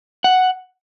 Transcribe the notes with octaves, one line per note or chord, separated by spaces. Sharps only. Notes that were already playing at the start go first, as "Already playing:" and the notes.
F#5